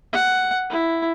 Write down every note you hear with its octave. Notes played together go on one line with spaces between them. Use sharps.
F#5
E4